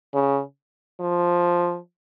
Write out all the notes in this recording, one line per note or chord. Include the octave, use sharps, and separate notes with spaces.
C#3
F3